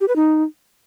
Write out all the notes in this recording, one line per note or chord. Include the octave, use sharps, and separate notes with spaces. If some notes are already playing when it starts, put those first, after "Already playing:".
G4
B4
D#4